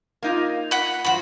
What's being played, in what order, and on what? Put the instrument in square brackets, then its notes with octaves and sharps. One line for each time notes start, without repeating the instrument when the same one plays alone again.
[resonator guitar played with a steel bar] A#3 D#4 F4
[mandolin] F#5 B5
[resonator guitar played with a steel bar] G2 F3 [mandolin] F#4 B5